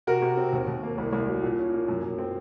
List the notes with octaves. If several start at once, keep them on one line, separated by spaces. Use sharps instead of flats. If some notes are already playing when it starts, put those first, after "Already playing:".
C3 F#4 A#4
C3
C4
D#2
D#2
A#3
C2
C2
F#3
A#2
C#4
A#3
F#2
F#2
C4